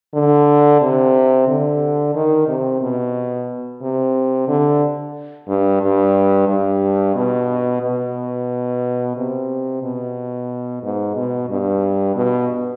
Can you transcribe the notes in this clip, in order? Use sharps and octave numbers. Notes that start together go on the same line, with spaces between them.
D3
C3
D3
D#3
C3
B2
C3
D3
G2
G2
G2
B2
B2
C3
B2
G#2
B2
G2
B2